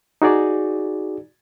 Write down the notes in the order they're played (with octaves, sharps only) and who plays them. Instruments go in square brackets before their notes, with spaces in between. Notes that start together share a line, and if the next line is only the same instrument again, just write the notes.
[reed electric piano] D#4 F#4 G#4 D5